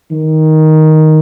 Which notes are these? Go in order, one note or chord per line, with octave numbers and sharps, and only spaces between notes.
D#3